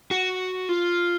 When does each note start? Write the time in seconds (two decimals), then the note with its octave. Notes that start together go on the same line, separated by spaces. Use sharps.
0.11 F#4
0.69 F4